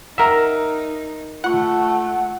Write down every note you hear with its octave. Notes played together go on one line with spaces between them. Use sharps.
D#4 A#4 E5 F#5 G5 A#5
A3 F4 F#5 C#6